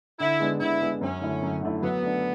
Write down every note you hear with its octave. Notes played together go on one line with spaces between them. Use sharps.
D3 E4
G#3 B3 D4
D3 E4
G#3 B3 D4
F#2 C#4
D3 A3 E4
F#2
D3 A3 E4
F#3 B3
A3 D4